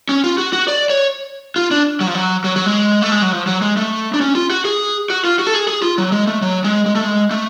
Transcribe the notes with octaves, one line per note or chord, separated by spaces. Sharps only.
C#4
F4
F#4
F#4
D5
C#5
F4
D4
F#3
F3
F#3
F#3
F#3
G#3
A3
G#3
F#3
F3
F#3
G#3
A3
D4
C#4
F4
F#4
G#4
F#4
F4
F#4
A4
G#4
G#4
F4
F#3
G#3
A3
F#3
G#3
G#3
A3
G#3
A3